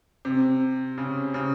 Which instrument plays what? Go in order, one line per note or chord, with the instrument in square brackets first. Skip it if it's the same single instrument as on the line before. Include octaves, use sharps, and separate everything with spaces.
[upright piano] C3
C#3
C#3